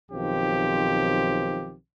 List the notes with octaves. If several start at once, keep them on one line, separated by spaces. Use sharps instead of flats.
B1 D#3 F3 C4 G4